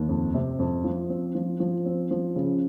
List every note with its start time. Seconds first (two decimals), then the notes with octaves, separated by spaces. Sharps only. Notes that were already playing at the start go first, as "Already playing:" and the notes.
Already playing: D#2
0.09 F2
0.34 C3
0.59 F2
0.84 F3
1.10 C4
1.35 F3
1.60 F3
1.86 C4
2.11 F3
2.36 C#3